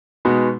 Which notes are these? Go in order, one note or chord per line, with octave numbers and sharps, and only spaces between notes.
B2 G#3 B3 D#4 F#4